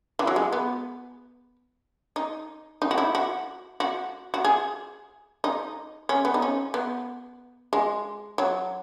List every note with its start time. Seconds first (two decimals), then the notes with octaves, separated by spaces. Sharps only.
0.19 E3
0.27 F#3
0.36 G#3
0.52 B3
2.16 D#4
2.82 D#4
2.91 F#4
2.98 E4
3.15 F#4
3.80 F#4
4.34 F#4
4.45 G#4
5.44 D#4
6.09 C#4
6.25 B3
6.34 D#4
6.42 C#4
6.74 B3
7.73 G#3
8.38 F#3